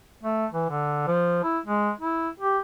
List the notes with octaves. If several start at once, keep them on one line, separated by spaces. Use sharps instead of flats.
A3
E3
D3
F3
E4
G#3
E4
G4